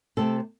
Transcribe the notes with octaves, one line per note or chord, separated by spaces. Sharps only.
C3 A3 C4 A4